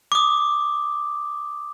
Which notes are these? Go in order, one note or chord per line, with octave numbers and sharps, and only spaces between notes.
D6 D#6